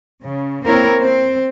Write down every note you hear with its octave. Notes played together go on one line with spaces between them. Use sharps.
C#3
A#3 C4 E4 A#4 C#5
C4 C5